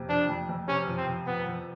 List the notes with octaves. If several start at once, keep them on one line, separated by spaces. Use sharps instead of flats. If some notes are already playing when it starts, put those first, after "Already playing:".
Already playing: F2 C3 A#3
F3 D4
F2
F2
C3 C#4
F3
C4
F3
F3 B3
F3